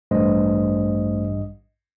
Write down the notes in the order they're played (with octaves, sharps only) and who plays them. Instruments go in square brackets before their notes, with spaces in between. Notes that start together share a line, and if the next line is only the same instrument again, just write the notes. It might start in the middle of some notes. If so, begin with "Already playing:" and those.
[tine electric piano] A1 G2 D#5 [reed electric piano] A3 C5